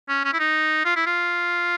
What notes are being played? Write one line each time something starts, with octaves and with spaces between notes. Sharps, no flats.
C#4
C#4
E4
D#4
F4
E4
F4